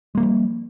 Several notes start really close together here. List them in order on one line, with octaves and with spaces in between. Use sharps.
G#3 A#3 G3 F3